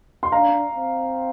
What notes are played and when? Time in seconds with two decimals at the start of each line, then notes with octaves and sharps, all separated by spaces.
0.23 C6
0.32 D4 F5 A#5
0.76 C4